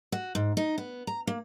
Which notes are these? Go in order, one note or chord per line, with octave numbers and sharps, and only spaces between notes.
F#4
G#2
D#4
B3
A#5
A#3